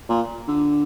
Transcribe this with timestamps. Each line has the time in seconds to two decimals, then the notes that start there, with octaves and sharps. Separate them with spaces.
0.09 A#2
0.48 D3